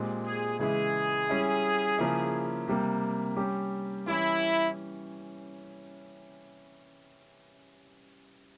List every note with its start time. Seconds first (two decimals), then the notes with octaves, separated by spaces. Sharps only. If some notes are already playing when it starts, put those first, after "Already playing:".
Already playing: A#2 G#3 C4 G4
0.25 G#4
0.60 C#3 E3 G#3 E4 G#4
1.29 G3 C#4 E4
1.98 C#3 F3 A#3 E4
2.68 C3 G3 A#3
3.37 G3 C#4 G4
4.06 E3 G3 C#4 E4